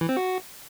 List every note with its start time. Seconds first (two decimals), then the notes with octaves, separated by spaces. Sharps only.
0.01 E3
0.09 C4
0.17 F#4